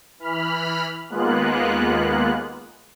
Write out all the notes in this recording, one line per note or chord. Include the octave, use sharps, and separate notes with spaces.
E3 B5 F6
D#2 G#3 A#3 B3 F4 F#6